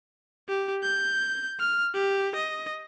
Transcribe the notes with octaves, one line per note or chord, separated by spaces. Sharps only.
G4
G6
F6
G4
D#5